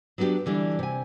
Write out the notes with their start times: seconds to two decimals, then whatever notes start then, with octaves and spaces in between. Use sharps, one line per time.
0.18 F#3 B3 D4 D#4 G4
0.46 D3 E3 G3 D4
0.79 C3 G#5